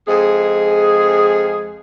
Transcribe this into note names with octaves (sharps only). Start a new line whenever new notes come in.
F2 G#3 G#4